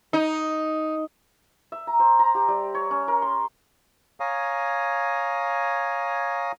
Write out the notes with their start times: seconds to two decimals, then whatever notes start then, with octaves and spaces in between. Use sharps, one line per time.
0.13 D#4
1.72 E5
1.87 A#5
2.00 C5
2.19 A#5
2.35 G4
2.48 G3
2.75 C#5
2.91 C#4
3.08 A#4
3.22 C6
4.20 C#5 F5 G#5 A#5 D#6